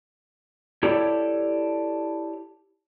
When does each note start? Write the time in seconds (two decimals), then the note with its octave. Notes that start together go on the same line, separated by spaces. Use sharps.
0.83 E4 G4 A4 C#5 D5